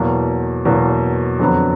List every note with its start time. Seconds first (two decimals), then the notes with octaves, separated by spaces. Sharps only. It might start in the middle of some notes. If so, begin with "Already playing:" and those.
Already playing: E2 B2 F#3 A#3
0.65 E2 B2 F#3 A#3
1.39 F2 D3 F#3 B3